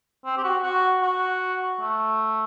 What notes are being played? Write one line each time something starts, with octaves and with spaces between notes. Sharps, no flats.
C4
G4
F#4
F#4
F#4
A3